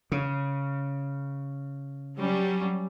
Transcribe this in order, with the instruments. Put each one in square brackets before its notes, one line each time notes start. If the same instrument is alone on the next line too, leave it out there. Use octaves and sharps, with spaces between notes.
[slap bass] C#3
[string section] F#3 G3 C#4